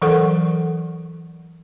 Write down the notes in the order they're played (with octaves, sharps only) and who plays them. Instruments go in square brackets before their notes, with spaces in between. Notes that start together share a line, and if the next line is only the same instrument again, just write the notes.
[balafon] E3 F#3 A4 A#4 F#5 C#6